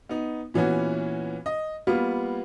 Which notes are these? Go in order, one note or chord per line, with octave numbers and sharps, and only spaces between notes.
B3 D#4
A#2 E3 B3 C#4 F#4
D#5
G3 A#3 B3 F4